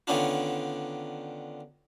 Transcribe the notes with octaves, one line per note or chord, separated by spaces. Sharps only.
D3 D#3 B3 C#4 D4 F4